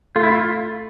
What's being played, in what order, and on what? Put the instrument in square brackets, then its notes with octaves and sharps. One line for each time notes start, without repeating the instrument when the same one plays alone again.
[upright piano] A3 [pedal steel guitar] F4
[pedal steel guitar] E4
F4